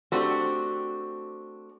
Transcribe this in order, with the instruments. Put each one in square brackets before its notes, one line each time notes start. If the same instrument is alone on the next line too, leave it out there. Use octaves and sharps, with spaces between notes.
[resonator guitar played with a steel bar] A3 C4 D4 F#4 G4